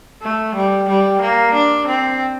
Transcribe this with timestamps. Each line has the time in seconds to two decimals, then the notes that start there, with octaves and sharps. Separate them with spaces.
0.22 A3
0.55 G3
0.88 G3
1.21 A#3
1.54 D4
1.87 C4